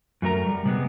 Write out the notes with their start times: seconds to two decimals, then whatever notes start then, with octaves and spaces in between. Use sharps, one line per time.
0.22 F#2 A3 A#4 A#5
0.46 G3
0.65 C3 G3 G#3 B3 G#4